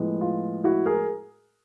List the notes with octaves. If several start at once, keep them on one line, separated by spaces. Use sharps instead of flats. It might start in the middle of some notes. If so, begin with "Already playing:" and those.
Already playing: A2 F3 G#3 B3
F4
E4 F#4
G#4 A#4